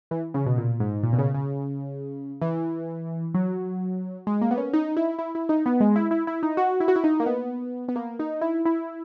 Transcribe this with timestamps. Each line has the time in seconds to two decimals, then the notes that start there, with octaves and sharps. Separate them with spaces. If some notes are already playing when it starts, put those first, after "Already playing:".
0.11 E3
0.34 C#3
0.46 B2
0.58 A#2
0.80 G#2
1.03 A#2
1.13 B2
1.19 C#3
1.34 C#3
2.42 E3
3.34 F#3
4.27 G#3
4.41 A#3
4.51 B3
4.57 C#4
4.73 D#4
4.96 E4
5.19 E4
5.35 E4
5.49 D#4
5.66 B3
5.80 G#3
5.96 E4
6.11 E4
6.27 E4
6.43 D#4
6.57 F#4
6.80 E4
6.88 F#4
6.96 E4
7.04 D#4
7.20 A#3
7.26 B3
7.88 B3
7.96 A#3
8.19 D#4
8.41 E4
8.65 E4